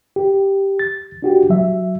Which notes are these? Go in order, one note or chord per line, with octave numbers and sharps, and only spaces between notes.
G4
A6
D4 F#4 G4
F#3 E5